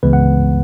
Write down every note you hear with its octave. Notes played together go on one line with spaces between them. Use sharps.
C#2 C#3 E3 G#3 B3 B4
F#5